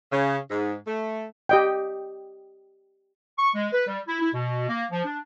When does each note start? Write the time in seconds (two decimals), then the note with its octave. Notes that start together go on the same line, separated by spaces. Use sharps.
0.12 C#3
0.50 G#2
0.87 A3
1.49 G4 D#5 G5
3.38 C#6
3.54 G#3
3.73 B4
3.88 G3
4.07 E4
4.21 E4
4.34 B2
4.69 A#3
4.91 F3
5.05 D4